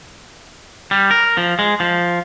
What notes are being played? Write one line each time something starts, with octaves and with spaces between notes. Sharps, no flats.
G3
A#4
F3
G#3
F3